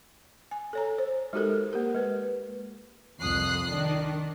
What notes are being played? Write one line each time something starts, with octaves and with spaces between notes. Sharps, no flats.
G#5
A4 C#5 A#5
C5
G#3 D#4 F#4 G4 A4 A#4
A#3 G4 A#4
G#3 B4
C2 F2 D#6 F#6 C7
D#3 D4